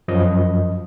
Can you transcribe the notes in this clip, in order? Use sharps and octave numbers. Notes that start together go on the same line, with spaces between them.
F#2 F3 D#5